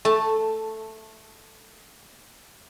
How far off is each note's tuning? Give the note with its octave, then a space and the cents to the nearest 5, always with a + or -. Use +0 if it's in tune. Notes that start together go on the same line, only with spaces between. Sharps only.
A3 +0 A5 +10